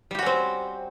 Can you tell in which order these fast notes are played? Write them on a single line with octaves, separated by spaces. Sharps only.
G3 G4 F#4 C#4 C4